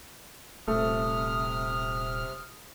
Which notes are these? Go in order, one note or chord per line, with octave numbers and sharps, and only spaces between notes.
D#1 C3 A3 D#6 F6